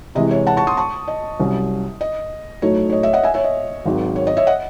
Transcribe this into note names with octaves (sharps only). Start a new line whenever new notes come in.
C3 E3 G#3 D#5
C#5
F#5 A5
A5 C#6
C6 D#6
A5 C#6
D#5
C2 C3 F#3 C#4
D#5
A2 F#3 A3 D#4 F#4 C#5
C#5
D#5
C#5 E5
D#5 F#5
E5 G#5
C#5 E5
D#5
G#1 G#2 D#3 F#3
C#5
D#5
C#5 E5
D#5 F#5